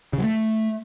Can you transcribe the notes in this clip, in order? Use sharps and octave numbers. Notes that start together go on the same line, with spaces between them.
C#3
F#3
A3